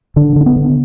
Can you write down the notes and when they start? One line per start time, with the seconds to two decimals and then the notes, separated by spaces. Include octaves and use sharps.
0.16 D3 D4
0.36 D3 D4
0.46 B3
0.56 D3